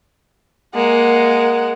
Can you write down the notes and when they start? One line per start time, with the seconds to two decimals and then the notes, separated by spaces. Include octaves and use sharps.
0.75 G#3 A#3 F#5